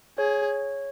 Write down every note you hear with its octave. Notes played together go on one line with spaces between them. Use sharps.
G#4 C#5